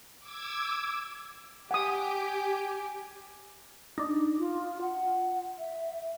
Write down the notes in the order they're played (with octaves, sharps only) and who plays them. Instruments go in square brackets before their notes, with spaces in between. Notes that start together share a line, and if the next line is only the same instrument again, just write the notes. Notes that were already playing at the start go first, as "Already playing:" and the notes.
[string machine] D6 E6 G#6
[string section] G4 [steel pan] F#5 D#6 [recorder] G#5
[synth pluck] D4 D#4
[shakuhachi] F4
F#5
E5